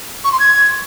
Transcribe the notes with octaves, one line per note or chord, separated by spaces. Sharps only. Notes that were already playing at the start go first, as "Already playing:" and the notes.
C#6
C6
G#6